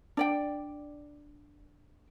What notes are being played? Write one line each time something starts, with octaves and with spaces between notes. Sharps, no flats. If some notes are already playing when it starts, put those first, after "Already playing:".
D4 D5 G5